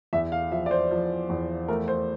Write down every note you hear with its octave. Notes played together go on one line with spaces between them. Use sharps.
E2 E5
F5
F3 E5
D5
C5
F3
E2
A3 A#4
C5